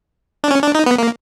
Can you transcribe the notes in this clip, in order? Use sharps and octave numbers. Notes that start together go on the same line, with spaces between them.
D4
C#4
D4
D#4
B3
A#3